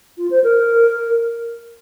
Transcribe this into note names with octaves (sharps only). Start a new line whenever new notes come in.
F4
C5
A#4